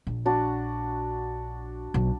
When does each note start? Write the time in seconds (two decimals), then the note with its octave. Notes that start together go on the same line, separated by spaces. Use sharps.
0.07 A#1
0.26 D4 F#4
1.94 B1